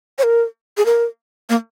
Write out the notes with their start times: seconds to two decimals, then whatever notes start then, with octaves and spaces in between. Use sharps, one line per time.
0.19 C#5
0.23 A#4
0.78 G#4
0.86 A#4
1.49 A#3